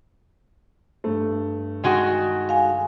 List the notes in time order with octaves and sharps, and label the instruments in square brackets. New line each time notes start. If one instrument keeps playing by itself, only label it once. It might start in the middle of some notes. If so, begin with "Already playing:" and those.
[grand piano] G2 A3
[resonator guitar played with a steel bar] D#3 G#3 F#4
[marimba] F5 G#5